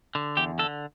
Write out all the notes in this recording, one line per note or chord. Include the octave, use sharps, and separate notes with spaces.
D3
E2 G4
D3 A4